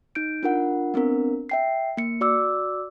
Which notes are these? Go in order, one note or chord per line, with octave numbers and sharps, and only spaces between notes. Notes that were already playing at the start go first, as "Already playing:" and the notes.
D#4 G6 D7
D4 F4 A#4 F#5
B3 C4 D4 A#4
E5 G5 C7
A#3 C#7
F#4 D5 D6 E6